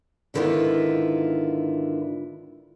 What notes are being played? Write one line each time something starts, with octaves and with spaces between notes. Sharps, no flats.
G#2 D3 D#3 B3 E4 F4